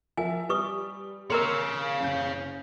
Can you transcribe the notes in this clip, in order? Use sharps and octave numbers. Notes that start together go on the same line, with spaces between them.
F3 A#4 E5 G#5
G3 B4 C#6 D#6
A#3 A#4 C#5 F5 A#5 C6
F#1 G6